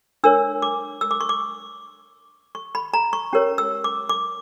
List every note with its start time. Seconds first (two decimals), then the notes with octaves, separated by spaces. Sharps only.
0.24 D4 A#4 C#5 E6
0.62 D6
1.01 E6
1.11 D6
1.21 C#6
1.29 D6
2.55 C#6
2.75 B5
2.94 A#5
3.13 C#6
3.33 C#4 G4 A#4 C#5
3.58 E6
3.84 D6
4.09 D6